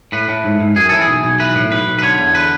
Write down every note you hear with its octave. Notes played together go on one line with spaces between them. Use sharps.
A2 B4
A2
G#2
G#2
F#2 G#4
E3 A4
G#4
B1
B1
E3 B4
A2
B1 B4
B1
B4
D3 C#5
E2
D3 B4